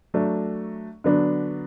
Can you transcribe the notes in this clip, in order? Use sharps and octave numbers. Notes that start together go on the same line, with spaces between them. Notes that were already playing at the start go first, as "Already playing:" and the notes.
F#3 A3 D4
D3 F#3 B3 D4